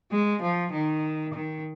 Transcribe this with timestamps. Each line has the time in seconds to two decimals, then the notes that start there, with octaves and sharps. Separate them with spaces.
0.12 G#3
0.42 F3
0.72 D#3
1.33 D#3